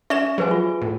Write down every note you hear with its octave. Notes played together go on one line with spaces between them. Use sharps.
C#4 D5 E5 C#6 E7
F3 F#3 G#4 B4 G#5
F4
A2